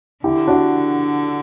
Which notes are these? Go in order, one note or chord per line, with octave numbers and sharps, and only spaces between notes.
D3 E4 G4
D4 F#4